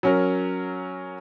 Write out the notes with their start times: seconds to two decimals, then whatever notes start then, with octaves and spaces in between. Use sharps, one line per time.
0.03 F#3 C#4 A#4